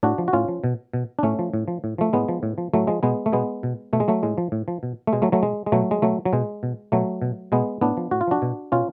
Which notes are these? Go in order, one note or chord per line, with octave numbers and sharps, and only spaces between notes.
A2 D4 F#4
F3
F#4
A2 C#4 F4
F3
B2
B2
D4
A2 A3 C#4
F3
A2
F3
A2
F3 A3
A2 G#3 B3
F3
A2
F3
A2 F#3 A3
F3 G#3
B2 G#3 B3
A3
B2 G#3 B3
B2
B2 A3
G#3
F#3 A3
A2 G#3
F3
A2
F3
B2
A3
B2 G#3
F#3 A3
F#3 A3
B2 G#3
G#3
B2 F#3 A3
G#3
B2 F#3 A3
F#3
B2 G#3
B2
B2 F#3 A3
B2
B2 G#3 B3
A2 B3 D4
F3
A2 F#4
F4
F3 D4 F#4
B2
B2 C#4 F4